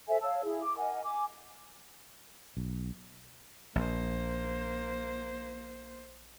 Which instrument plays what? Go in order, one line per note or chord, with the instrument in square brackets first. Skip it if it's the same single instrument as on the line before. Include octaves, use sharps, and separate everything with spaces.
[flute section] A4 C5 E5 G#5
C#5 F5 A5 E6
E4 G#4
D6
A#4 D#5 F#5 G#5
G#5 D6
[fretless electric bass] B1
[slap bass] A#1 [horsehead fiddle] A#3 C5